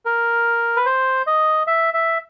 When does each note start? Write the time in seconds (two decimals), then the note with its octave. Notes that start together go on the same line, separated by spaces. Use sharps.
0.06 A#4
0.77 B4
0.86 C5
1.27 D#5
1.67 E5
1.94 E5